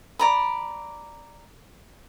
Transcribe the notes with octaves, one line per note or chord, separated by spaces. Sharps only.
D5 A#5 B5